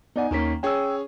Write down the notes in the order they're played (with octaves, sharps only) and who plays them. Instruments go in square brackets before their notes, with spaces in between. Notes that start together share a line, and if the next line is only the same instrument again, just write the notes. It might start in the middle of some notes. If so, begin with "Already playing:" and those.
[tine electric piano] B3 D5 F#5 [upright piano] D#4 G#5
[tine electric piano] D#2 B6 [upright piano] D#3 A#3 C#4
[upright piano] C#4 G#4 C#5 [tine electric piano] G5 E6